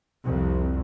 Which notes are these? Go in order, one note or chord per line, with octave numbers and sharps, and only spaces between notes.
C2 F2